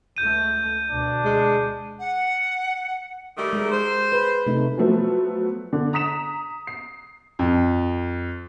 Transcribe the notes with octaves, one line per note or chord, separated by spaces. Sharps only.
C#2 A3 G6 D#7
D2 B2 D4
G#3
F#5
D#3 G3 A3
G#3 A#4
C5
B4
C3 A3 D#4
F3 F#3 A3 B3
D3
A#5 D#6 B6 E7
C7
F2